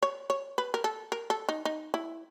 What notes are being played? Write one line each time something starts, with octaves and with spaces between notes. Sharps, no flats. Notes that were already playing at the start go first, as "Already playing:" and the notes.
C#5
C#5
B4
A#4
A4
A#4
A4
D#4
D#4
E4